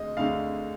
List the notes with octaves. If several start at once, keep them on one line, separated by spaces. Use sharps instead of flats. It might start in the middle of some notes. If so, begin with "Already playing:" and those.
Already playing: D2 G#3 D#5
D2 D3 G#3 F5